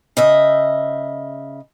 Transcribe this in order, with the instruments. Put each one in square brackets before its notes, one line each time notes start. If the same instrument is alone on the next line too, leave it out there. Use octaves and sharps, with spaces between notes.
[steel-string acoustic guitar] C#3 D#5 E5